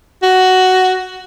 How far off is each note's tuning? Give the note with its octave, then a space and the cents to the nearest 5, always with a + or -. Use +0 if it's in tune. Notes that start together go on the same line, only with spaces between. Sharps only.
F#4 +10